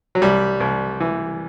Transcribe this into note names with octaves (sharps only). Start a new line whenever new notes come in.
F#3
C2 G3
C2
E3